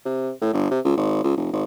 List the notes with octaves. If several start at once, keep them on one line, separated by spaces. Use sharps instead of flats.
C3
A2
G1
C3
C#2
G#1
C#2
F1
G#1